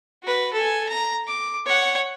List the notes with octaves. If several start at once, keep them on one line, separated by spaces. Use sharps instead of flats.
F#4 B4
A4 G#5
A#5
D6
C#5 F#5